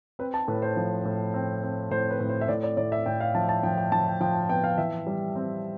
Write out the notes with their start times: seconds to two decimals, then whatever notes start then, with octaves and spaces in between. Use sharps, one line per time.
0.19 C4 B4
0.34 A5
0.48 A2 B4
0.62 C5
0.77 F3
1.05 A2
1.34 C4
1.63 C4
1.91 A2 C5
2.10 B4
2.20 A2
2.29 C5
2.41 E5
2.48 A2 D5
2.63 D5
2.77 A2 D5
2.92 E5
3.06 A2 G5
3.20 F5
3.35 F3 A5
3.49 A5
3.63 F3 G5
3.78 G5
3.92 F3 A5
4.07 G5
4.21 F3 G5
4.49 B3 G5
4.64 F5
4.78 E3 E5
5.07 G3
5.36 C4